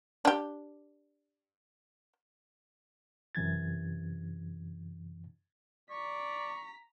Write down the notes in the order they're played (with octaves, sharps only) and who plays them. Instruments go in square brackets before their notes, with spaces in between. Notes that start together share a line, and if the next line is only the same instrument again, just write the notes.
[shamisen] D4 G4
[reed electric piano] F#2 C3 E3 G#6 A6
[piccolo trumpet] D5 [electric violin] A#5 B6 [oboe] C#6